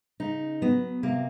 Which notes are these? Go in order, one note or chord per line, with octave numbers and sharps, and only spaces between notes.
C#3 D#4
F#3 B3
C3 A#3